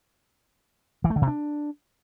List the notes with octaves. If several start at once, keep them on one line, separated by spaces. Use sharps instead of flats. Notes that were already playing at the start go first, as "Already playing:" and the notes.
E3
A3
D3
C3
D4